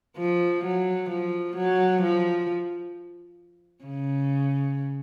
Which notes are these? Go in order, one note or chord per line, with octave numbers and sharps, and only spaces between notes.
F3
F#3
F3
F#3
F3
C#3